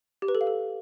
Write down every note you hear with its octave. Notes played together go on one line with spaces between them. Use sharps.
G4
B4
A4
F5
A4